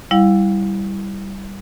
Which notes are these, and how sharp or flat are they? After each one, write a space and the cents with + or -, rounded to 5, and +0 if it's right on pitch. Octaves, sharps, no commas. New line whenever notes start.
G3 +0 E4 +0 F5 +35